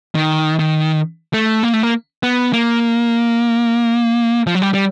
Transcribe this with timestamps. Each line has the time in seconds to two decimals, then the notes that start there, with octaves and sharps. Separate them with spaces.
0.15 D#3
0.59 D#3
1.33 A3
1.63 A#3
1.73 A3
1.83 A#3
2.23 B3
2.53 A#3
4.47 F3
4.55 F#3
4.62 G3
4.74 G3